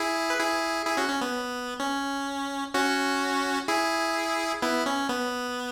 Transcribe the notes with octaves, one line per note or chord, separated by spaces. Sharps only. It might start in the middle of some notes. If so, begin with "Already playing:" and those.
Already playing: E4 G#4
B4
E4 G#4
E4 G#4
C#4 F#4
C#4
B3
C#4
C#4 F#4
E4 G#4
B3 E4
C#4
B3